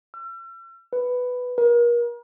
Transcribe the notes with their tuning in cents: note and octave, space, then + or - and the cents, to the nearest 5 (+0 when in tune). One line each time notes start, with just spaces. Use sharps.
E6 +45
B4 +5
A#4 +35